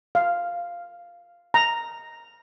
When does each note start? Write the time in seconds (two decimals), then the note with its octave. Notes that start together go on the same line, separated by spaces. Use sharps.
0.15 F5
1.54 A#5